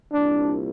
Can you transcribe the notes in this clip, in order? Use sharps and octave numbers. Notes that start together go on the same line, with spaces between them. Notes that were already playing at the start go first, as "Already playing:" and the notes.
C2 A#2 D4